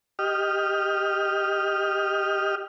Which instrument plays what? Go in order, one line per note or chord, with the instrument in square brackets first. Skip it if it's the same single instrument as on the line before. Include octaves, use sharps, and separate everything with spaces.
[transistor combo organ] G4 D#5 F6